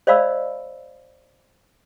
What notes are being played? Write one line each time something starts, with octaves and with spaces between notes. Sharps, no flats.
C5 D5 D#5 F5 B5 E6